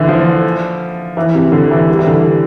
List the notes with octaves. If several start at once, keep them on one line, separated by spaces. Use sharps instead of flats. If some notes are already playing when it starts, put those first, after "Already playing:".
Already playing: D3 E3
F3
E3
C3
D3
E3
G3
E3
D3